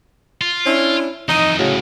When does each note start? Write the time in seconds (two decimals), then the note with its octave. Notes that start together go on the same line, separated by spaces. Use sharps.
0.41 F4
0.65 C#4 D4 E4
1.29 F2 E3 D#4 D#5
1.58 C2 A2 C#3 F#3